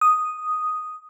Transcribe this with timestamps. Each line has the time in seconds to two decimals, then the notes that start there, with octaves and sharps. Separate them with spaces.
0.01 D#6